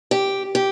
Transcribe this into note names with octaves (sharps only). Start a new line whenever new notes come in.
G4
G4